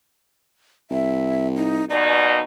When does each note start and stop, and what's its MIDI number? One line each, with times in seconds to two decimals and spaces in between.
0.91 1.86 36
0.91 1.47 76
1.56 1.85 63
1.90 2.42 39
1.90 2.42 47
1.90 2.42 63
1.90 2.34 74